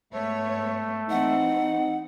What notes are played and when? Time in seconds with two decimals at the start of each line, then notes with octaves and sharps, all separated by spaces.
0.13 G#2 A3 B3 C#5
1.10 E3 C4 D#4 F#5